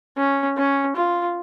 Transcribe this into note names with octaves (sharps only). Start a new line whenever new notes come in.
C#4
C#4
F4